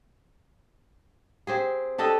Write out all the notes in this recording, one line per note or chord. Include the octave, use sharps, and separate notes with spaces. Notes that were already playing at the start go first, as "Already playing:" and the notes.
C4 G4 G#4
D4 G4 A4 D#5